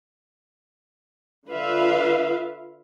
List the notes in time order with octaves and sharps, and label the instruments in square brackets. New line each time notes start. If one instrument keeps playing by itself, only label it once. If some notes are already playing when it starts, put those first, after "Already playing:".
[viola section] D3 F4 B4 E5 F5